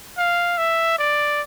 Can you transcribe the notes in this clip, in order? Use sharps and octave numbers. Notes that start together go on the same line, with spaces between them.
F5
E5
D5